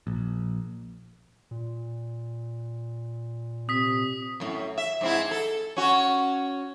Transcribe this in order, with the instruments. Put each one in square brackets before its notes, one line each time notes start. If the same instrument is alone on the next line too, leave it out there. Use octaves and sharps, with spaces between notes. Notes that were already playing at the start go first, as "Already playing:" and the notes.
[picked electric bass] A#1
[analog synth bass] A#2
[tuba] C3 [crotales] D#6 B6
[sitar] F#2 A2
E5
G#2 C4 E4
A4
C#4 F#4